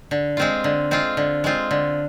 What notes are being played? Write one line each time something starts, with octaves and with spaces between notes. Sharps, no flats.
D3
G#3 C4 F4
D3
G#3 C4 F4
D3
G#3 C4 F4
D3